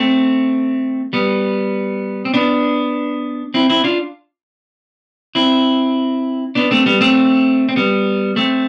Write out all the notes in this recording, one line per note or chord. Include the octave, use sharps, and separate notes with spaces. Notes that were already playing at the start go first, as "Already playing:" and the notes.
Already playing: A3 C4
G3 B3
C4
B3 D4
C4 E4
C4 E4
D4 F4
C4 E4
B3 D4
A3 C4
G3 B3
A3 C4
C4
G3 B3
A3 C4